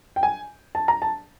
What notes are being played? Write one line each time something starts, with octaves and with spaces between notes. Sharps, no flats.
G5
G#5
A5
A#5
A5